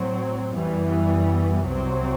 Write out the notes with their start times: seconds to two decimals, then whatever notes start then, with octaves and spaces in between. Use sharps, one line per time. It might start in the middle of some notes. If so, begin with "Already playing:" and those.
Already playing: A2 F#3 C4
0.55 F#2 E3 G3 B3
1.64 C2 C3 F#3 C4